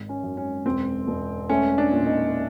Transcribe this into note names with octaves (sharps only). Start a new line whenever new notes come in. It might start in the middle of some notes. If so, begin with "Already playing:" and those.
Already playing: G#1
C#4
F#2
C#4
E1 C4
E1
A3 C#4
D4
A#2
D#4